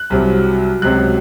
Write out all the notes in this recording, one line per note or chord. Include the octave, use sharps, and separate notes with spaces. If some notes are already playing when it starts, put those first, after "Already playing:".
Already playing: F#6
C2 C3 F#3
C#2 C3 F#3 F#6